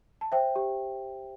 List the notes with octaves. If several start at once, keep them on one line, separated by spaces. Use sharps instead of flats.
A5
C5 E5 G5
G4